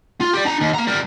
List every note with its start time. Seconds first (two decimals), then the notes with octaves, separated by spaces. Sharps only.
0.21 F4
0.33 G4 D5
0.45 D4 A#5
0.60 D#2
0.74 A#3 A#5
0.87 G3 A#4